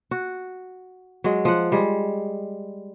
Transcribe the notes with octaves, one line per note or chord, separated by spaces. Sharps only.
F#4
F#3 G#3
F3 F#5
G3 G#3